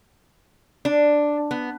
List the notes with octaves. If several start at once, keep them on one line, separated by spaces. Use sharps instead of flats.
D4
B3